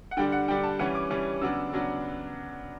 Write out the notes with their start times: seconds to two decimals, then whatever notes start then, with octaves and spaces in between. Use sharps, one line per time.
0.11 F#5
0.17 D3 G3 D4 G5
0.32 F#5
0.48 D3 G3 D4 G5
0.63 A5
0.79 E3 G3 C#4 F#5
0.95 D6
1.11 E3 G3 C#4
1.41 C#3 F#3 B3 D4 E6
1.73 C#3 F#3 B3 D4